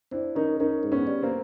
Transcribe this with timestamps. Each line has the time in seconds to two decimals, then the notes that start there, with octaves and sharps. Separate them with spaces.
0.11 C4 D4 E4
0.35 D#3 C#4 D#4
0.60 D#3 C#4 D#4
0.83 G#2
0.92 B3 C#4
1.07 G3
1.22 A#3 C4